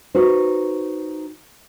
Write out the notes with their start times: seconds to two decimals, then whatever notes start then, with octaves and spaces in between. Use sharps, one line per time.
0.15 D#4 F#4 B4 C5